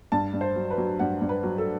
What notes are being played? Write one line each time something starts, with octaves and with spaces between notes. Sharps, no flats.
G2 A5
G2
C5
F#3
B4
F#3
G2 F#5
G2
B4
F#3
A4